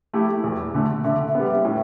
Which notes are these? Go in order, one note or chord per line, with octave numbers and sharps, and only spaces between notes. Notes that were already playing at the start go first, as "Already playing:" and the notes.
A3 E4 G4
E2
D3 A3
D3 E5
E5
G3 B3
A2